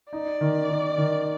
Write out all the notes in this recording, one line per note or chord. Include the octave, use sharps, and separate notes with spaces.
D#4 D5
D#3
D#3
D#3